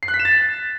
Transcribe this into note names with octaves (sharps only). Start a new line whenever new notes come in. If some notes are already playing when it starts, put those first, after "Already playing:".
C7
F#6
B6
E7
A6